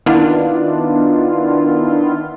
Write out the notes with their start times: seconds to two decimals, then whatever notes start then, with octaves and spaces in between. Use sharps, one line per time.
0.06 D#3 B3 D4 E4 F4